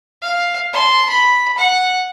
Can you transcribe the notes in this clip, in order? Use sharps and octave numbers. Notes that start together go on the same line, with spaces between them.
F5
A5 C6
B5
F#5